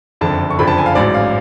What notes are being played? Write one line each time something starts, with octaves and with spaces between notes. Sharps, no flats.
F#1 F2 D3 A5
C#6
F#1 F2 D3 F3 B5
A5
G#5
F5
A1 G#2 F#3 D5
F5